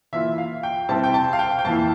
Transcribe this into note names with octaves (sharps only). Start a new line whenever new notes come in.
E3 A#3 F4 E5
F5
G5
C3 G3 C4 E4 A5
G5
A5
F5
G5
G5
F2 E3 A#3 E4 A5